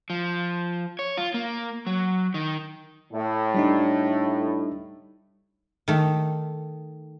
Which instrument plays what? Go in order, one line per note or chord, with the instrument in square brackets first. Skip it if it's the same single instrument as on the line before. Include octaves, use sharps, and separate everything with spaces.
[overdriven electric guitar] F3
C#5
F4
A#3
F#3
D#3
[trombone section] A2
[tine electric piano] G3 D4 D#4
[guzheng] D#3 A3